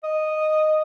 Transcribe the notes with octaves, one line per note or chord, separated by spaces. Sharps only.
D#5